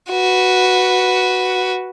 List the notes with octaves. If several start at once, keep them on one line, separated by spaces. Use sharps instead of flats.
F#4 B4